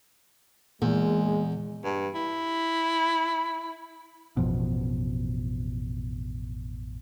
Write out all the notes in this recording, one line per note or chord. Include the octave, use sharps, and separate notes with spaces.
E2 A#2 G#3
G2
E4
A1 F2 B2